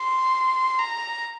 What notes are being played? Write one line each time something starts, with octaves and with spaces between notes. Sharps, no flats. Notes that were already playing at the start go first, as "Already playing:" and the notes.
Already playing: C6
A#5